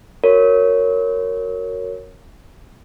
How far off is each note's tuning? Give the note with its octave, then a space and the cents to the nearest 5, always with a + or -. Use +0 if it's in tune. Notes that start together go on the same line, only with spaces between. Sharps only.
F#4 +0 A#4 -10 C#5 +0